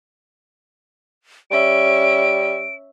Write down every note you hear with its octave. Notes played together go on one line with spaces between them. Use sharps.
G3 C#4 E5 D7